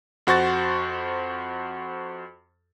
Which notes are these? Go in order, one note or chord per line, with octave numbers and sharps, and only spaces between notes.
F2 F#4 C5 C#6 A6